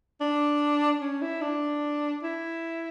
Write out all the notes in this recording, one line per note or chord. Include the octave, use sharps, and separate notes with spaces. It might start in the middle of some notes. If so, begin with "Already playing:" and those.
D4
C#4
E4
D4
E4